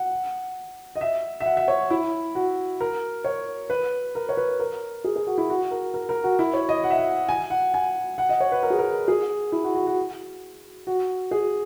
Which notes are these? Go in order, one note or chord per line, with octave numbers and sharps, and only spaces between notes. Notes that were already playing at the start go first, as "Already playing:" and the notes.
Already playing: F#5
D#5
E5
E5
F#5
E5
C#5
E4
F#4
A#4
C#5
B4
A#4
C#5
B4
A#4
G#4
G#4
F#4
E4
F#4
A#4
A#4
A#4
F#4
E4
C#5
D#5
F#5
E5
F#5
G#5
F#5
G#5
F#5
D#5
C#5
B4
A#4
G#4
A#4
G#4
E4
F#4
F#4
F#4
F#4
G#4